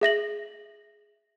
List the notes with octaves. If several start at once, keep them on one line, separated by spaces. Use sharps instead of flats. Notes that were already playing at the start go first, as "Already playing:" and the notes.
G#4 E5 A#6 F#7